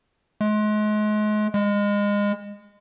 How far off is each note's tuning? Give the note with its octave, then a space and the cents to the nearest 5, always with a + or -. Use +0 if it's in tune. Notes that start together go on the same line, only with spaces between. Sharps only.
G#3 +35
G#3 -25